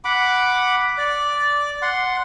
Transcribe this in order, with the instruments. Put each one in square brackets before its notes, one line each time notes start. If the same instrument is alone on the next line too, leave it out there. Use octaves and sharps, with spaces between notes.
[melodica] F#5 B5 D6
D5
F#5 C6